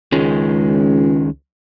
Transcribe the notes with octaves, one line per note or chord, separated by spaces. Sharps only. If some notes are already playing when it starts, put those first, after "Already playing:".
C#2 D#3 G#3 C#4